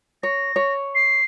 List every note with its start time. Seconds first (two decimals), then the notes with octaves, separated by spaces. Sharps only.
0.23 C#5 A#6
0.56 C#5
0.95 C7